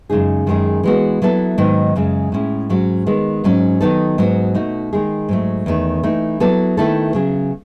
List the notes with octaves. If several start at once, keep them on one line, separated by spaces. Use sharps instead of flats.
F#2 C#3 G#3 D#4 G#4
F#2 D#3 G#3 C#4 G#4
E3 G#3 B3 F#4
F#3 B3 E4 A4
G#2 D#3 F#3 B3
F#2 C#3 G#3
A2 G#3 C#4 E4
G#2 F#3 C#4 F#4
D#3 G#3 B3
G#2 F#3 C#4
D#3 F#3 B3 D#4 A4
G#2 F#3 B3 F#4
B2 A3 D#4 F#4
D#3 G#3 D#4 G#4
G#2 F#3 A3
E2 D#3 A3
E3 A3 D#4
F#3 B3 E4 A4
D#3 A3 E4 A4
C#3 F#3 C#4 G#4